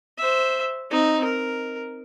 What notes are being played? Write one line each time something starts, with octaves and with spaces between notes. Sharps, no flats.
C5 E5
C4 D#4
A#4